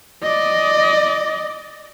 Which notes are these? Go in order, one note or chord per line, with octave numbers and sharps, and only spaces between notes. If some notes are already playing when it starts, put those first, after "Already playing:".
D5 D#5